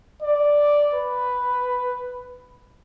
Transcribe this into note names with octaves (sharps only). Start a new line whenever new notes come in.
D5
B4